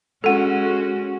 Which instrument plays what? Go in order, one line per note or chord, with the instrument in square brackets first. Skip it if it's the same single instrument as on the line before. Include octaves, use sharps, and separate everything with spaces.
[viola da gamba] G#3 C#4 F#4 [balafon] A4 F#5